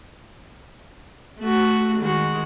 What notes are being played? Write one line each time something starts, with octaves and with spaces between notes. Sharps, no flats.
A3 F#4
D#3 G#3 F#4